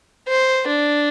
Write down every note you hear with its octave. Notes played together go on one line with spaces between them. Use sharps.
C5
D4